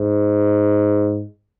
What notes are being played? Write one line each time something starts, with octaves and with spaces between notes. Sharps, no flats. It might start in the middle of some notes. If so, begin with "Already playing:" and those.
Already playing: G#2